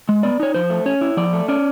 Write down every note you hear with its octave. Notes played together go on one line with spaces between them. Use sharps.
G#3
B3 D5
D#4 C#5
F3 C5
A3
C#4 C#5
E4
F3 D5
A3
C#4 D5